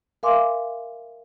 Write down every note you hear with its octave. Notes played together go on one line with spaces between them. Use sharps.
A#4 E5 F5 G#5 C6 D6